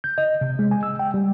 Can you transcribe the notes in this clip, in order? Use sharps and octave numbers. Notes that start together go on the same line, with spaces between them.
G6
D#5
C3
G#3
G#5
E6
G5
G3